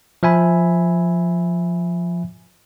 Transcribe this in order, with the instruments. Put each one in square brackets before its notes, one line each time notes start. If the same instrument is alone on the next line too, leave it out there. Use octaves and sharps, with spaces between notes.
[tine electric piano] F3 E5 G#5 B5